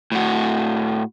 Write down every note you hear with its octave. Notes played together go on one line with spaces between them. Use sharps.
A2 F#4